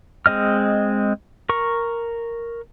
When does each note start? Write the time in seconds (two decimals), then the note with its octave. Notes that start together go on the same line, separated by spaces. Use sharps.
0.26 G#3 C4 D#5 F6
1.49 A#4 C#6